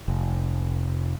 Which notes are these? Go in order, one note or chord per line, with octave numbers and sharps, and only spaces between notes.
F1